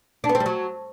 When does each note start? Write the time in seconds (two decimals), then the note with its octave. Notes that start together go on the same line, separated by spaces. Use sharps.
0.24 D4
0.29 B3
0.35 C4
0.40 G3
0.46 F#3